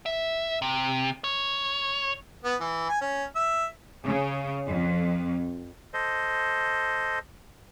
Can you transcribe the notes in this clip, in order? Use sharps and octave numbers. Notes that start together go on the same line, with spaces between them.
E5
C3
C#5
B3
E3
G#5
C#4
E5
C#3
F2
A4 C5 D#5